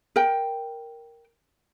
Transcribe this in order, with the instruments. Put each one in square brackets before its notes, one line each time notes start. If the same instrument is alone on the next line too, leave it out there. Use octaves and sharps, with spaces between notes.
[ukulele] A#4 G5